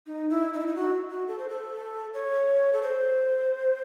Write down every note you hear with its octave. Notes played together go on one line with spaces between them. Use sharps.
D#4
E4
D#4
E4
D#4
F#4
F#4
A4
C5
A4
C#5
A4
C5